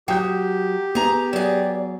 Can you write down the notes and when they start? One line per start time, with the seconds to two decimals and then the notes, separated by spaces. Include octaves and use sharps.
0.08 F#3 G4 G5 D#6 G6
0.95 B3 G#4 A#5
1.33 F#3 G#4 D5